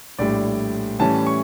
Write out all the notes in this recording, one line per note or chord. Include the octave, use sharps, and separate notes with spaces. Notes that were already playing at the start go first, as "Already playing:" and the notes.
A#1 A2 G3 D5
A2 E3 G3 C#4 A5
C#6